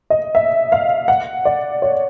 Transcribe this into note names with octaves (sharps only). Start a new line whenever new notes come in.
D#5
E5
F5
F#5
D5
C#5